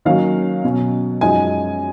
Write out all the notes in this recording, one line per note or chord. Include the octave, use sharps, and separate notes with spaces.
D#3 F#3 A#3 C#4 F5
B2 F#3 C#4
F#2 F3 G#3 D#4 G#5